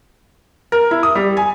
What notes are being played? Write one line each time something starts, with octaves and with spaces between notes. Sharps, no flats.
A#4
E4
D#6
G3
G#5